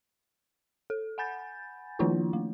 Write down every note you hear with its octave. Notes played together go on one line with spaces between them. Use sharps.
A4
F#5 G#5 B5 G6 A6
D#3 F3 A#3 D4 E4 F4
A3